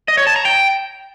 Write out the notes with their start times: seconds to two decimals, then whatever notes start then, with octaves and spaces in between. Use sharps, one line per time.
0.08 D#5
0.17 C#5
0.27 A5
0.36 A#5
0.45 G5